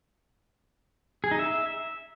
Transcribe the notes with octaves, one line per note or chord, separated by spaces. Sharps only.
G#4
D#4
E5